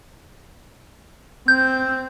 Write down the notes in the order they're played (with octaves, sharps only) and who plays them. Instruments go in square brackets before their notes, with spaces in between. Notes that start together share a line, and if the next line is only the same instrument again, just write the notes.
[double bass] C4 [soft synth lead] G6